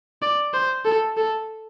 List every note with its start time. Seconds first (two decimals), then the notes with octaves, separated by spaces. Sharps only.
0.22 D5
0.53 C5
0.85 A4
1.17 A4